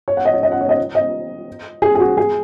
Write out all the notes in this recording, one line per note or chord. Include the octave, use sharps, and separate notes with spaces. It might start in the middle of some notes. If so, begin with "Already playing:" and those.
C#5
F#5
D#5
C#5
D#5
F#5
C#5
D#5
D#5
G#4
G#4
F#4
G#4